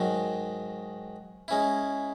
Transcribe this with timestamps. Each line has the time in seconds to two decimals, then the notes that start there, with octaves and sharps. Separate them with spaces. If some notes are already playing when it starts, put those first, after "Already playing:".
Already playing: G#2 D#3 F#3
1.48 G#3 C#4 E4